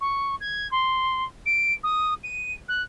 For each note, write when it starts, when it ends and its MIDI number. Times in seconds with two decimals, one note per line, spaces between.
0.01 0.35 85
0.41 0.70 92
0.71 1.24 84
1.46 1.73 98
1.83 2.14 87
2.24 2.53 99
2.68 2.82 90